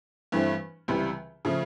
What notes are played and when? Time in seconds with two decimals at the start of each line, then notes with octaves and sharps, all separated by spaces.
0.32 G2 E3 A3 C4
0.88 C#2 C3 E3 G3
1.45 C#3 F3 A3